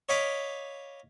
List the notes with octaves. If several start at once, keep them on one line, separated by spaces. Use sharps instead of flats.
C#5 D#5 F5 B5 D6